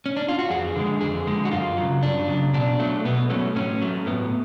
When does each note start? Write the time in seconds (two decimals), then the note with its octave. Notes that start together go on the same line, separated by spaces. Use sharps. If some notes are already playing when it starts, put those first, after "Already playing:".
0.06 C#4
0.17 D4
0.29 F4
0.39 F#4
0.50 F2 G#4
0.76 D3 G#3
1.01 F2 G#4
1.27 D3 G#3
1.45 F#4
1.51 F#2 F4
1.77 F#3
1.82 C#3
2.02 F#2 D4
2.28 C#3 F#3
2.54 B2 D4
2.79 F#3 A3
3.05 B2 B3
3.30 F#3 A3 C#4
3.55 A2 C#4
3.82 F#3 A3
4.06 A2 B3